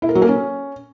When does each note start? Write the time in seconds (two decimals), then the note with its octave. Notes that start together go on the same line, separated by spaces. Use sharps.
0.02 E4
0.09 A#4
0.15 F#3
0.22 A#3
0.28 C#4